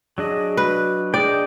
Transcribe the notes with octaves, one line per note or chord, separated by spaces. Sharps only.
F#3 D4 G#4 D#5
F#4 B4
D4 G#4 D5 D#5 G5